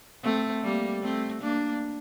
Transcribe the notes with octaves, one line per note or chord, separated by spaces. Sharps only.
A3 C4
G3 A#3
A3 C4
A#3 D4